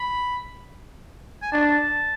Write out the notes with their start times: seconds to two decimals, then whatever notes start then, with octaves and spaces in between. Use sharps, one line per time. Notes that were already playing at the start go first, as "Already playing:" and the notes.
Already playing: B5
1.42 G#5
1.52 D4 A5